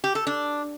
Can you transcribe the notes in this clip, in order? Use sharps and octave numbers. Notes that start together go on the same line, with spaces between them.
G4
A4
D4